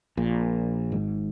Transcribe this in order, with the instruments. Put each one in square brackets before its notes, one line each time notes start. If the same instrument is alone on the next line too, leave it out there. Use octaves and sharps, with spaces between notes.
[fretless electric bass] A#1 A#2
G#1 G#2